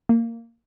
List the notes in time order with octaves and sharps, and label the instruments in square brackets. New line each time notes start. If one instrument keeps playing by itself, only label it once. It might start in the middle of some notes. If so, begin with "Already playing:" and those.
[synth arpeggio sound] A#3